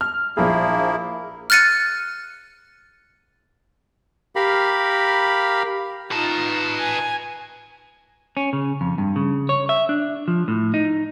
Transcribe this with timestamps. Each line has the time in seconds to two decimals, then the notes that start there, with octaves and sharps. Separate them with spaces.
0.01 F6
0.37 A#1 F3 A#3 E4 G#4
1.50 F6 F#6 A6 C#7 D#7
4.36 G4 A#4 F5 B5
6.12 D#4 F4 B4 A5
6.79 G#5
8.37 C#4
8.53 C#3
8.81 F2
8.98 G2
9.16 C#3
9.49 C#5
9.69 E5
9.89 D4
10.28 F3
10.48 A2
10.74 D#4